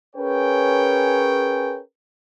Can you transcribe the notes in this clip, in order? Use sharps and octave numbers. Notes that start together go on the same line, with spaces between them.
C#4 G#4 A#4 B4 C#5 G5